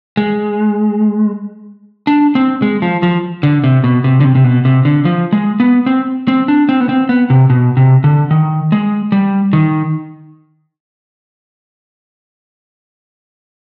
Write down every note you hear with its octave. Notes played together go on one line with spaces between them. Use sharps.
G#3
D4
C4
G#3
F3
F3
D3
C3
B2
C3
D3
C3
C3
B2
C3
D3
F3
G#3
B3
C4
C4
D4
C4
B3
C4
B3
C3
B2
C3
D3
D#3
G#3
G3
D#3